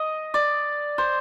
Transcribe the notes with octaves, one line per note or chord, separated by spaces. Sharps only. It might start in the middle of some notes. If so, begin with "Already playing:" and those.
Already playing: D#5
D5
C5